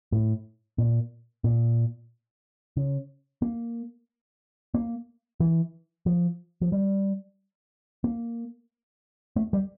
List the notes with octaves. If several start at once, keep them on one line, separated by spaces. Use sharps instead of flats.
A2
A#2
A#2
C#3
A#3
A#3
E3
F3
F3
G3
A#3
A3
G3